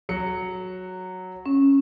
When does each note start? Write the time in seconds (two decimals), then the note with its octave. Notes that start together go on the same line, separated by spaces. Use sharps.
0.09 F#3 C#7
1.46 C#4